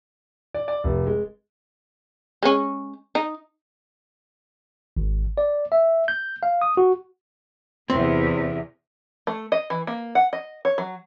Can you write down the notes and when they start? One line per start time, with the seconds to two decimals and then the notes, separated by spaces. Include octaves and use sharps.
0.54 D5
0.68 D5
0.84 F1
1.06 G#3
2.43 G#3 C#4
3.15 D#4
4.97 G#1
5.38 D5
5.72 E5
6.08 G6
6.43 F5
6.62 D#6
6.77 F#4
7.90 E2 C3 C4
9.27 A3
9.52 D#5
9.70 E3
9.87 A#3
10.15 F#5
10.33 D#5
10.65 C#5
10.78 F#3